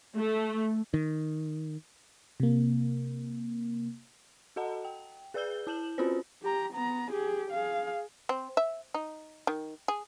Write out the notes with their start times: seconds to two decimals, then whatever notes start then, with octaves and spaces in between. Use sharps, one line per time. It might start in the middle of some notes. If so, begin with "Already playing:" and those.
0.17 A3
0.94 D#3
2.40 C3 A#3
4.56 F#4 A4 D#5 F#5 A5 A#5
4.84 G5
5.34 G#4 B4 D5 E6 G6 G7
5.67 E4 A5 G6 E7 F#7
5.98 C4 C#4 F4 F#4 B4 C5
6.43 G4 A#5
6.73 B3 A#5
7.11 G4 G#4
7.51 G#4 F5
8.29 C4
8.57 E5
8.94 D#4
9.47 D#3
9.88 G#4